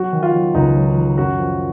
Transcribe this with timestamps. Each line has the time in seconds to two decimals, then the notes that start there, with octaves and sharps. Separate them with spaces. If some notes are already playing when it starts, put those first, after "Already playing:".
Already playing: F#3 F#4
0.13 D#3
0.23 F4
0.33 F#3
0.55 C#2 D#4
0.76 F#3
0.97 D#3
1.18 F#2 F#4
1.39 F3